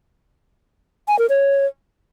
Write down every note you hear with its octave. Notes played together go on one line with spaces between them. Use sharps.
G#5
A#4
C#5